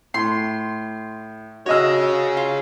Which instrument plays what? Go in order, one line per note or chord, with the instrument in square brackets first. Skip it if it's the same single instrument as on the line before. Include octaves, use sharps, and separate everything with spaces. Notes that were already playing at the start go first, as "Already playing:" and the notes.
[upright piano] A2 [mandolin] C6
[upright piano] F#4 D#5 E6 [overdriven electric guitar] G#4 C#5
[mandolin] F4